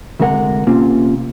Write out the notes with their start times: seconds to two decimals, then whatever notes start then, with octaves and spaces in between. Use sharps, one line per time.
0.20 D2 C3 G#3 A#4 F#5
0.67 C3 A#3 C4 C#4 F4